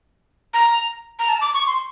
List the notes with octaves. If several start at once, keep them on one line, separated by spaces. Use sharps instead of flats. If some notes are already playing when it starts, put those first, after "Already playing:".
A#5
A#5
A5
D6
C#6
C6